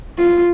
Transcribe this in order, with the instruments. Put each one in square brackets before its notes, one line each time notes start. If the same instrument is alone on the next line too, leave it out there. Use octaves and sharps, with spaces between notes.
[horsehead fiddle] F4